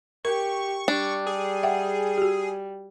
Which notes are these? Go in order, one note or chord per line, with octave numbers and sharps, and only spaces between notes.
G4 A#4 C#6
G3 D4
G#4
E5 F#5 G5
F#4 G4